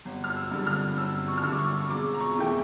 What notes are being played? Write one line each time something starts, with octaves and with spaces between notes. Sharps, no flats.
G1
F6
E6
G2 D3
F6
G1 E6
C#6
F6
G2 D3 E6
D6
C#6
E1 D6
A#5
C#6
E2 E3 A3 G5